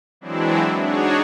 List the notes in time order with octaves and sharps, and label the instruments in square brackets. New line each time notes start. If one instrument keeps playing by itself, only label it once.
[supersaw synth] E3 F#3 G#3 C4 D4 E4
D4 D#4 F#4 G#4 C#5